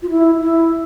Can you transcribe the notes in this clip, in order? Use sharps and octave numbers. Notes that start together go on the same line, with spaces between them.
F4
E4
E4